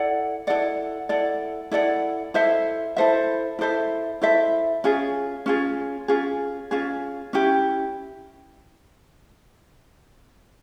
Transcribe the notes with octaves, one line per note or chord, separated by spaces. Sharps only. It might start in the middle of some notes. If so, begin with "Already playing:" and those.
Already playing: E4 A4 D5 F#5
E4 A4 D5 F#5
E4 A4 D5 F#5
E4 A4 D5 F#5
E4 A4 C5 E5
E4 A4 C5 E5
E4 A4 C5 E5
E4 A4 C5 E5
C#4 F4 G#4
C#4 F4 G#4
C#4 F4 G#4
C#4 F4 G#4
C#4 E4 G4